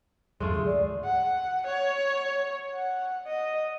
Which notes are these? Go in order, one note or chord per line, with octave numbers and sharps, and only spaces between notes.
E2 G2 G#3 A3 F4
G#2 D3 F#3 G#4
D2 D5
F#5
C#5
F#5
D#5